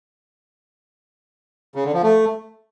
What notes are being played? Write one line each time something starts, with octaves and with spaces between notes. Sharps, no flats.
C#3
D3
F3
A3